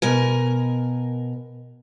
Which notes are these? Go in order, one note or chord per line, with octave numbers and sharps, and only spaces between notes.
B2 A#4 G#5